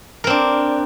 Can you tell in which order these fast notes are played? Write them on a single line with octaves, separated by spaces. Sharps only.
A#4 C4 D4